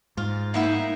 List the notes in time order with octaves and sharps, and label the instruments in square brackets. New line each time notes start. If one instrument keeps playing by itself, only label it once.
[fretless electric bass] G#2 [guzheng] F4
[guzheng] A#3 B3 E4 [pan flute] D#4 [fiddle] E5